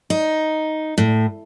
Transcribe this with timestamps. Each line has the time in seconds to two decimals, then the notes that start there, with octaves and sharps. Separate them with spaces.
0.10 D#4
0.98 A2